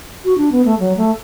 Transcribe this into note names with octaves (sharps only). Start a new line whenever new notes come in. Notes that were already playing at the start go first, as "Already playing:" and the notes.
F#4
D4
B3
A3
F#3
A3